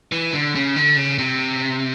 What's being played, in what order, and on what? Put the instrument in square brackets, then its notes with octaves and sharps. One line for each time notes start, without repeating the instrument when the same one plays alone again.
[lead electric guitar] E3
D3
C#3
D3
C#3
C3